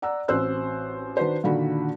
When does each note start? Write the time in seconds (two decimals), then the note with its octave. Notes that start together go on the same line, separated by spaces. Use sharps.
0.02 D5 F#5 A#5 E6
0.28 A1 C4 F#4 C5 E6 F#6
1.17 D#3 D4 F#4 B4 C5
1.43 A#2 D3 D#3 F#4 B5